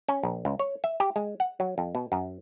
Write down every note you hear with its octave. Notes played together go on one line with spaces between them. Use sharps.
C#4
A#1
C#2
C#5
E5
G4
G#3
F#5
F#3
F2
B2
F#2